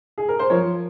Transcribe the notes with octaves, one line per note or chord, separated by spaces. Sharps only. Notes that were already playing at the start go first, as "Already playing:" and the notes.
G#4
A#4
C5
F3 A#4 C#5